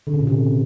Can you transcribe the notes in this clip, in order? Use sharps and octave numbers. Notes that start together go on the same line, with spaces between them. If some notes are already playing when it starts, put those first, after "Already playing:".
D3
C#3
A#2
C3